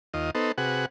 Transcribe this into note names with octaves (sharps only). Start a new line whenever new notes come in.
D#2 F4 D#5
B3 D#4 A4 C5
C3 F#4 G#4 B4 F#5